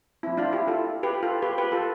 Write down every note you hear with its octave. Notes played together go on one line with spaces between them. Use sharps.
F3 C4 E4
D4 F4
E4 G4
F4 A4
G4 B4
F4 A4
G4 B4
G4 B4
F4 A4